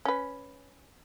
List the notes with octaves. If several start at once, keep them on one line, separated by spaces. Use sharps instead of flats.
C#4 B4